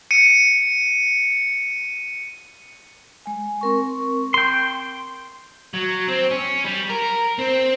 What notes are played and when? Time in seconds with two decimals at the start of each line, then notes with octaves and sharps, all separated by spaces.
0.11 C#7 D#7
3.26 G#3 G#5
3.61 C4 A#4 C#6
4.34 G5 C6
5.74 F#3
6.08 C4
6.31 C#4
6.65 G3
6.90 A#4
7.38 C4